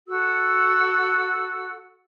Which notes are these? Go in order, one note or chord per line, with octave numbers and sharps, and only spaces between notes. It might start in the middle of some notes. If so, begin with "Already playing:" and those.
F#4 A4 F#5 E6